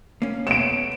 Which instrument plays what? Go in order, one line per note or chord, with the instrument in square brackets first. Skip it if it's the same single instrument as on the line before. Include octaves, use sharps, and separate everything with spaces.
[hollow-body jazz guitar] A#3 C#4
[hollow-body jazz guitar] A3 B3 C#5 [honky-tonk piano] D7 E7